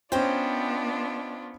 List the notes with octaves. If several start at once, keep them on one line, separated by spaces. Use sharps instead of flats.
B3 C#4 D4 F4 C5 D#5 G5